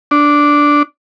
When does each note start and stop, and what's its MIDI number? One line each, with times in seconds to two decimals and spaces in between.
0.11 0.83 62